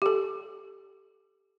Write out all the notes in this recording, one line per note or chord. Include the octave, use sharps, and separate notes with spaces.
G4 A4